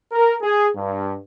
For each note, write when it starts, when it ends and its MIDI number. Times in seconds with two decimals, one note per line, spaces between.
0.12 0.36 70
0.42 0.68 68
0.76 1.16 43